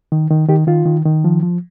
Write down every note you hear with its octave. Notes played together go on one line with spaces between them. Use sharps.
D#3
D#3
D#3 G4
D#3 F4
D#3
D#3
F3
F3